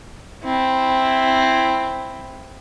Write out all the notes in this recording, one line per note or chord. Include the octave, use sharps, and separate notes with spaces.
C4 E4